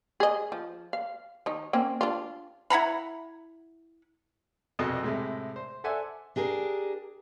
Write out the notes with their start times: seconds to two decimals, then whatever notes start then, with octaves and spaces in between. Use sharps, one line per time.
0.20 G#4 D#5
0.52 F3
0.93 F5
1.46 D#3 D#4
1.73 A#3 C4 C#4
2.01 D4 F4
2.70 E4 F#5 A#5 B5
4.79 C2 F2 B2 D#5
5.03 A2 C3 G#3
5.56 C5
5.84 A4 C5 D5 E5 F#5 G#5
6.36 D4 G4 G#4 A#4